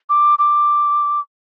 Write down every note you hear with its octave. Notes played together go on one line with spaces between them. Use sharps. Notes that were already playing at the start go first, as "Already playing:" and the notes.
D6
D6